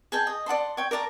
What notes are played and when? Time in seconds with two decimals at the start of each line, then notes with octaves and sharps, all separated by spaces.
0.12 G#4 G5 A5
0.27 D#5
0.46 D5 F#5 A5 C6
0.77 C#5 G5
0.91 A#4 D5 A5 A#5